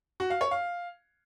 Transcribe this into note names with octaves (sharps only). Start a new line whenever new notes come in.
F#4
F5
C#5
F5